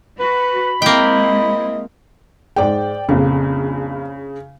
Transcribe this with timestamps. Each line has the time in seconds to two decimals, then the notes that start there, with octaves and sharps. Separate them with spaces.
0.19 F#4 B4 B5
0.82 G#3 A#3 C4 E4 D#5 G5
2.56 G#2 G#3 D5 G5
3.09 A#1 F2 C#3